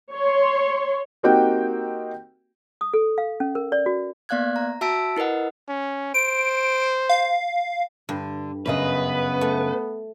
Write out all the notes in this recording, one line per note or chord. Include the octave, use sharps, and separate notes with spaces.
C#5 C6
A#3 C4 D#4 F#4 G4 G5
D#6
A4
F5
C#4
A#4
D5
F#4
A#3 B3 D5 F5 F#6 G#6
A#5
F#4 E5 A5 E6 B6 D7
E4 A#4 B4 D#5 F#5
C#4
C5 D7
F5
G2 D3
F#2 C#3 B3 B4 D#5
A3